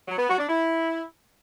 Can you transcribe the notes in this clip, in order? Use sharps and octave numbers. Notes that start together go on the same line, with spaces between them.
F#3
B3
F#4
D4
E4